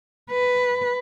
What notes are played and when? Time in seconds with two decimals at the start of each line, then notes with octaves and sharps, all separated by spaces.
0.31 B4